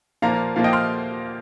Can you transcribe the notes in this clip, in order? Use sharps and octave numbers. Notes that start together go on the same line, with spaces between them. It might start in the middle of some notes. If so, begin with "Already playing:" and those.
A#2 F3 A#3 F5 A#5
A#2 F3 A#3 F5
D#5 G5
C6 F6